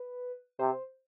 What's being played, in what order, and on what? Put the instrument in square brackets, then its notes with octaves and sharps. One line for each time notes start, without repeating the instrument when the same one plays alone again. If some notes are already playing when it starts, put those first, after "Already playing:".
Already playing: [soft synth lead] B4
[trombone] C3 [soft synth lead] C5